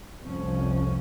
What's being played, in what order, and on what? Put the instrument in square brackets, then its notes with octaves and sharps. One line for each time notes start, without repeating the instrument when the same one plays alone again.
[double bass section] F1 C2 F2 F3 C#4